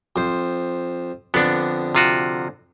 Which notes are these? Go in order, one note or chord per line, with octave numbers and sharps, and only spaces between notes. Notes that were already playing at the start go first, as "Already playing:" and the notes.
F2 C5
F2 D3 B3 D4
C3 F4 F#4